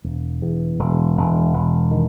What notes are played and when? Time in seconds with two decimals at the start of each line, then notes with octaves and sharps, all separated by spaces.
0.04 E1
0.42 E2
0.79 E1
1.17 E1
1.53 E1
1.91 D#3